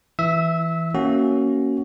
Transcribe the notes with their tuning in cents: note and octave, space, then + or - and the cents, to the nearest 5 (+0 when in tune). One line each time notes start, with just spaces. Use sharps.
E3 +0 E5 +0 E6 -25
A#3 +0 C#4 +0 F#4 +15